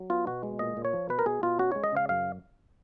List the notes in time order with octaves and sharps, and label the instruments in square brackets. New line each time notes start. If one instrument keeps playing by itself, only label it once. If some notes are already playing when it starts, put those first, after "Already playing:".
Already playing: [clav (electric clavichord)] F#3
B3 F4
B2 F#4
G#3
A#2 D#5
A#2
C#5
F3
B2 B4
A#4
B2 G#4
B2 F4
C#4 F#4
G#3 C#5
D#5
C#3 F5
F#2 F5